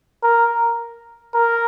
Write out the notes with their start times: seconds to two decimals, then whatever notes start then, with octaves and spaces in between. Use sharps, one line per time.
0.23 A#4
1.34 A#4